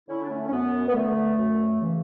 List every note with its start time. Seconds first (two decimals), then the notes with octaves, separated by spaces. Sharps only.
0.08 D3 C#4 E4
0.23 D4
0.30 A3 C#4
0.48 C#4
0.52 F#2 B3
0.87 B3
0.94 D3 A3
1.38 F#2
1.81 C#3 E3